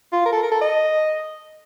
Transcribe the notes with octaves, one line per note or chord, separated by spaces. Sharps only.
F4
A#4
A4
A#4
A4
D#5